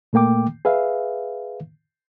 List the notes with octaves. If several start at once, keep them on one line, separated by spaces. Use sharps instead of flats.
A#2 A3 A#3 G5 D6
G#4 B4 E5 F5